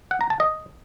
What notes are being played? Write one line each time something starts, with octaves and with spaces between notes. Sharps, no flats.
F#5
A#5
A5
D#5